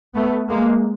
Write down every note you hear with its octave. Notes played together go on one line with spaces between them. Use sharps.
A3 B3
G#3 A#3